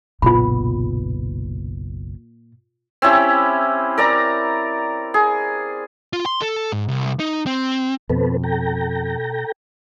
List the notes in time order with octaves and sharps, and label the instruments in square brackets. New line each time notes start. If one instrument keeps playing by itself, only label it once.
[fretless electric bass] F#1 B1 B3 [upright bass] A#2 [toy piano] F4 B5
[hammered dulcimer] C4 C#4 E4 G4
A#4 D5 A#5
G#4
[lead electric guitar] F4
C6
A4
G#2
C2
D#4
C4
[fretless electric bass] F2 [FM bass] B2 [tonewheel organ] C4 A4 B4
[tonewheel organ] A4 G5 A#5